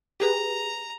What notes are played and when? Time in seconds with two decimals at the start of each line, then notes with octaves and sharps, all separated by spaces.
0.20 G4 G#4 B4 A#5